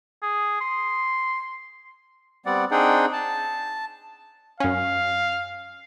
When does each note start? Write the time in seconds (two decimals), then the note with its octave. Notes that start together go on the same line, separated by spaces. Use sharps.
0.22 G#4
0.61 C6
2.46 G3 B3 C4 D5 F#5
2.71 C4 D4 D#4 G#4 F#5 G5
3.13 A5
4.60 F#2 C#4 F5